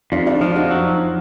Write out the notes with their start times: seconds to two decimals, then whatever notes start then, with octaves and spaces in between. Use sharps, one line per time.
0.12 F2 D4 F4
0.26 D4 F4
0.41 F3 D4 F4
0.56 D#4 F#4
0.71 F#3